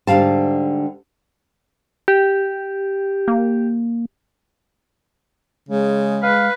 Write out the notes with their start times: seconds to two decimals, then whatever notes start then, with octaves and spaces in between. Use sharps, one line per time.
0.07 G#2 D3 G3 F5 A5
2.08 G4
3.28 A#3
5.69 C#3 G#3
6.23 B4 F5